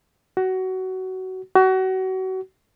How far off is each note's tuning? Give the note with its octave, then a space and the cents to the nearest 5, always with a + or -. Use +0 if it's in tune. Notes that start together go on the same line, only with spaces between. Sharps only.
F#4 +20
F#4 +30